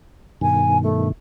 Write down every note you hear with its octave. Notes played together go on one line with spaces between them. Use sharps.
G2 B2 D#3 G#5
A3